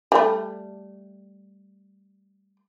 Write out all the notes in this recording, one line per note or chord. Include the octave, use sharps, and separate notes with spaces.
G3 A3